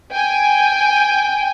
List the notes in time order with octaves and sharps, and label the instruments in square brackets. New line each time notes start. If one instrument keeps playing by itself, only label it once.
[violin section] G5 G#5